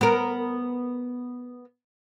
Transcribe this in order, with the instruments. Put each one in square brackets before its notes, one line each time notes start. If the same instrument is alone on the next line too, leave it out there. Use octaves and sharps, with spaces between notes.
[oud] B3 A#4